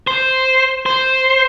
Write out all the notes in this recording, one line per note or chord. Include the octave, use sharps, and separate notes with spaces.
C5
C5